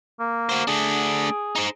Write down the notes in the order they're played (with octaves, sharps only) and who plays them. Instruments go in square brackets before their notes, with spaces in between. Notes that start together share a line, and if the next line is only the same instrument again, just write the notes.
[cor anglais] A#3
[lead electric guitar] F#4 C5
[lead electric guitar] A3 D4 [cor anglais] G#4
[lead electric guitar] D#4 C5